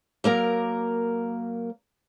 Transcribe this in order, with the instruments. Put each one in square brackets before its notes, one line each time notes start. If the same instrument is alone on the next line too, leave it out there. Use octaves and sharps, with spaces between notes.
[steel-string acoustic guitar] F#3 A#3 A#4 A#5